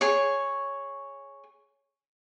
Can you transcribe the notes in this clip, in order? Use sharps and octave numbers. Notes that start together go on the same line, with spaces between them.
G#4 C#5